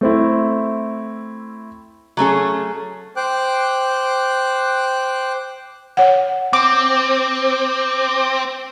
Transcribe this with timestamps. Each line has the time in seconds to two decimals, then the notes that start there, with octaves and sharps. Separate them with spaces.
0.01 A3 C4 E4
2.17 F#3 A3 C#4 G#4
3.16 C5 G5 D6 F#6
5.97 C#5 F#5
6.53 C4 D6